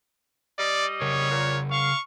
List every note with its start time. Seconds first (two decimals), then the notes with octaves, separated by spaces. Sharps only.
0.59 G3 D5 D#5
1.01 C#3 A#4 C#5
1.31 A#2
1.71 F5 C#6